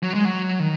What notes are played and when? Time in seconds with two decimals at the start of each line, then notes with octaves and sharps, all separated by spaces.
0.03 F#3
0.14 G#3
0.25 F#3
0.60 D#3